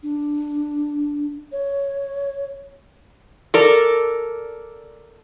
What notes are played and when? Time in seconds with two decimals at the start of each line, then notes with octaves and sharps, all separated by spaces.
0.03 D4
1.52 C#5
3.54 A4 A#4 D5